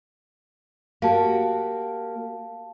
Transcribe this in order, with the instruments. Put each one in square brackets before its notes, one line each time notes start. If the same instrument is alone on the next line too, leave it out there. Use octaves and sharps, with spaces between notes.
[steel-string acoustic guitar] A#3 F#4 G4 [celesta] F5 A5